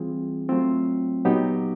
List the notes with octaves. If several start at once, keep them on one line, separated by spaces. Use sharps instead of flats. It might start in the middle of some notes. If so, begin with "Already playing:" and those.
Already playing: E3 G3 C4 F4 G#4
F#3 A3 C4 F4
A#2 F#3 B3 D#4 G4